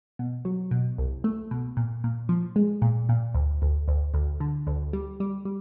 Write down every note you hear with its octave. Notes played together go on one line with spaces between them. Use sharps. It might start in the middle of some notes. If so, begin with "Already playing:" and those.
B2
F#3
B2
C2
A3
B2
A#2
A#2
F3
G#3
A#2
A#2
D2
D2
D2
D2
D3
D2
G3
G3
G3